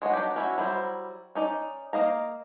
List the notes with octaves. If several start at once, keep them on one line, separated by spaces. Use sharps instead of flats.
G#3 C#5 D#5 F#5
F#3 D4 G4
C#4 E4 F#4
F#3 G3 E4 C5
C#4 D#4 D5
A#3 D#5 F5 A#5